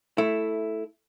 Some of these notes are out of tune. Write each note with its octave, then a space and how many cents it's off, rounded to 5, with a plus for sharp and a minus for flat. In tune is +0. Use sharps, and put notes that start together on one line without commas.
A3 +0 E4 +0